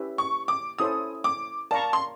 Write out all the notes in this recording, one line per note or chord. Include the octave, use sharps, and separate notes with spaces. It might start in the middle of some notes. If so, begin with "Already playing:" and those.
Already playing: C#4 E4 G4 B4 E5
C#6
D6
C#4 E4 A4 C5 D#6
D6
A#4 D5 F5 A5 A#5 C#6
C6